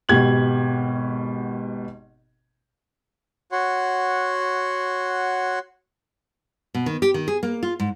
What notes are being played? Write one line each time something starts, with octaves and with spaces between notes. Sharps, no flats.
G#1 B2 G4 G#6 F#7
F#4 C#5 F#5 C6
B2
D#3
G4
D#3
G#4
A#3
F4
G#2